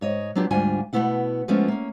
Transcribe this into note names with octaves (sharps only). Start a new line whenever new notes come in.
G#2 C#5 D#5
F#3 B3 D4 F4 G4
D2 G#2 G3 D4 F4 G#5
B2 F#3 A3 B3 E4 F#5
F3 G#3 A3 B3 C#4 F4
A#3 C#4